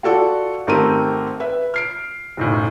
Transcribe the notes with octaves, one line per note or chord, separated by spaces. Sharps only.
F4 F#4 A4 D5 F#5
G#1 A3 C4 G4 A#4 D#7
B4 E5
F6 C7 D7
F#1 B1 A2